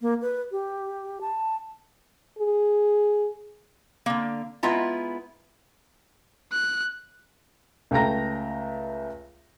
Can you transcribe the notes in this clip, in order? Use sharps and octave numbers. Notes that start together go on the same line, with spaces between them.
A#3
B4
G4
A5
G#4
D3 A#3
G#3 B3 E4 F4 A#5
F#6
C#2 A3 G5 A#5 A#6